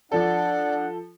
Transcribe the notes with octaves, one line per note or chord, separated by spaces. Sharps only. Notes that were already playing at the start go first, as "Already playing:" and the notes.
F3 D4 A4 D5 F#5